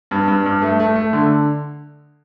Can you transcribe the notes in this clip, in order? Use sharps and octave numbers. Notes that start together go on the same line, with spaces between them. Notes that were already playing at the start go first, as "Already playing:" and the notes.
G2
G2
G2
A3
A3
A3
D3